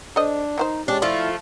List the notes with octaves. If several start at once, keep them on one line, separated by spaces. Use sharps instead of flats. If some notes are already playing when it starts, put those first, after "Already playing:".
D4 A4 C5 D#5
D#3 D#4 F#4 C5
G#3 C#4 D4 G4
F3 A3 E4 F4 D5